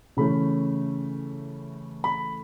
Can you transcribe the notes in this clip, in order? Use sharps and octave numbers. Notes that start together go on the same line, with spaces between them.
C#3 E3 A3 C#4 B5
B5